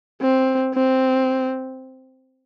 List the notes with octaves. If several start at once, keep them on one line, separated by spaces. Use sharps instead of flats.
C4
C4